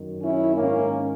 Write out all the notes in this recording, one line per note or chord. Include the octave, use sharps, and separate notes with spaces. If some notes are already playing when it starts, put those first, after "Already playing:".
Already playing: F#2 D#3
C#4 E4
G#2 D#3 A#3 C#4